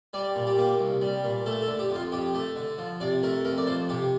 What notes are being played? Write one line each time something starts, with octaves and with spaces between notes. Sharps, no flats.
G3 D5
A#2
G4
A#3
C2
G3
A#2
A3 A4
A4
D3
G4
F2
F4
F2 G4
A3
D3
F3
C3 D5
A3 A#4
F2 A#4
D5
F3 C5
C3 G4